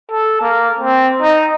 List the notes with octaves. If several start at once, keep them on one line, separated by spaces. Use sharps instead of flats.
A4
A#3
C4
D#4